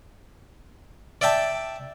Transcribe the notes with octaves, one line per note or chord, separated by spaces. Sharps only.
D5 E5 G5 A5